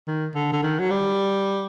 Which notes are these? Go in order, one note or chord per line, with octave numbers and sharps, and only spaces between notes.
D#3
D3
D3
D#3
F#3
G3